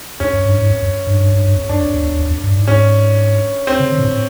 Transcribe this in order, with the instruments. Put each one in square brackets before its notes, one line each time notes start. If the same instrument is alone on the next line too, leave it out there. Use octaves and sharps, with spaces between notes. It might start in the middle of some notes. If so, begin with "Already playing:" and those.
[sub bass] F2 [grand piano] C#4
[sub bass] F#2
G2
G#2
F2
F#2
G2
G2
G2
G2
F2
[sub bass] F#2 [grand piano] D4
[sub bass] F2
E2
E2
E2
F2
G2
G#2
[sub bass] G#2 [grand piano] C#4
[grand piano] C4
[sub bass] C#3
D3
A#2
A2